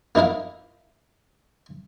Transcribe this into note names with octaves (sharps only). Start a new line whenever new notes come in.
A#3 D#4 E4 A#4 F5